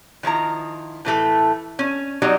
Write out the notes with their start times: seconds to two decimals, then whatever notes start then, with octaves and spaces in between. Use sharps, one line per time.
0.23 D#3 F3 E4 A#5
1.05 A2 E3 A3 A4
1.79 C#4
2.22 F#3 G3 C4 D#4 D5